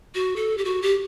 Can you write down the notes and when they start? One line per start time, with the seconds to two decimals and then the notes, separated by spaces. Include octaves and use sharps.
0.15 F#4
0.36 A4
0.58 G4
0.65 F#4
0.82 G4